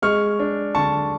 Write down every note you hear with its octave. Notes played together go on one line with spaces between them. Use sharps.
G#3 C#6 F6
D4
D3 A5 C#6